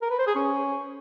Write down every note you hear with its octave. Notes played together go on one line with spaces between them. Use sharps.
A#4
B4
C5
G#4
C#4